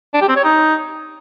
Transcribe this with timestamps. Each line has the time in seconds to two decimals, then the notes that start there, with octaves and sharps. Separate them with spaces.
0.14 D4
0.21 G4
0.29 C4
0.36 C#5
0.44 D#4